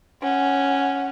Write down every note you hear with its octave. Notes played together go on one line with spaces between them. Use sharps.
C#4 F#5